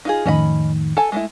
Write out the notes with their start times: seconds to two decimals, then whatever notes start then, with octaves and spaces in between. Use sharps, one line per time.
0.05 D#4 F4 G#4
0.26 F2 A2 D#3 C#4 D#5 B5
0.97 A4 G#5
1.12 G#3 A3 E4